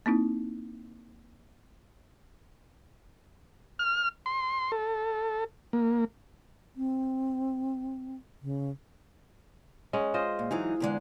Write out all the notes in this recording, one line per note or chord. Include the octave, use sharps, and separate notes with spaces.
A#3 C4 D#4 E4
F6
C6
A4
A#3
C4
C#3
G#3 C#4 F#5
F4 C5 D#5
A#2
E3 F#3 D#4 G#4
E2 D3 G#3